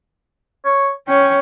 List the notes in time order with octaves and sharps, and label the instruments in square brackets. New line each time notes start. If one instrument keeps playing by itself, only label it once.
[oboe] C#5
[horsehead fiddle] C#4 C#5 [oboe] G5